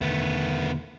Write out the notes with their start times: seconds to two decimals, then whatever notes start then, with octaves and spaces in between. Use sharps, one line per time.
0.01 E1 D3 D#3 A3 B3